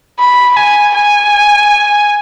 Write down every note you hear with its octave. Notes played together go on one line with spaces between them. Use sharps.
B5
G#5
G#5